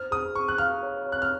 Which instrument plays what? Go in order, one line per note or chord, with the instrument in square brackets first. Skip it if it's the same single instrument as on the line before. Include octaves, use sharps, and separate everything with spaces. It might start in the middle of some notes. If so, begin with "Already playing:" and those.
Already playing: [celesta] C5 [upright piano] F6
[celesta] G#4 [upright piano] D#6
[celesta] G#4 [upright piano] C#6
[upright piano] F#6
[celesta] F5 [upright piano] F6
[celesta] C#5
C#5
[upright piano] F#6
F6